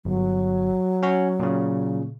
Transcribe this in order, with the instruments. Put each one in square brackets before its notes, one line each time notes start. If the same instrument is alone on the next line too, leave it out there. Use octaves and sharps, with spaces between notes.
[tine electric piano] G1 [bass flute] F#3
[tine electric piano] C#4 F#4
A#2 C#3